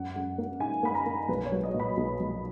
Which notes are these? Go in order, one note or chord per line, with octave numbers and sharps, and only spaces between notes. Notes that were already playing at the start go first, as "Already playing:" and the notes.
Already playing: F#2 F#5
F#2
A#3
D#4 G#5
A#3 B5
A#5
A#3
B1 B4
C#5
F#3
D#5
A#2
B5
B1
B1